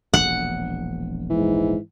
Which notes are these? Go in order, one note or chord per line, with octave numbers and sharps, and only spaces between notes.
E1 A#1 F#5
G#2 E3